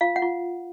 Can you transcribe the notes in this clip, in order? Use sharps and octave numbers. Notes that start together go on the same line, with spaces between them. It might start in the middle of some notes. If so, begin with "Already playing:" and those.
F4 F5
F#5
F4